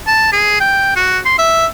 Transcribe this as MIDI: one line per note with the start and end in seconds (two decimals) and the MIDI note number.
0.07 0.29 81
0.32 0.57 68
0.60 0.92 79
0.96 1.19 66
1.25 1.37 84
1.38 1.67 76